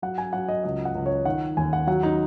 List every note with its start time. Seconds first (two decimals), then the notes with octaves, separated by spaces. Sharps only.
0.02 F#3 F#5
0.18 G#5
0.33 F#3 F#5
0.49 D#5
0.64 C#2 D#5
0.85 F#5
0.95 C#2
1.06 C#5
1.25 D#3 F#5
1.57 D#2 G#5
1.73 F#5
1.87 F#3 F#5
2.03 D#4